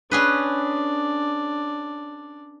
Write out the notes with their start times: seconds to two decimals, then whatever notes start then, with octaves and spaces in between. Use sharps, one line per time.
0.11 C#4 D4 G#4 B4